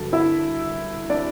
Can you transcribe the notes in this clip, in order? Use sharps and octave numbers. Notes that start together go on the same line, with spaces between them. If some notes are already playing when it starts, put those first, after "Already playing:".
Already playing: G2 D3 F#3 A4 A5
E4 E5
D4 D5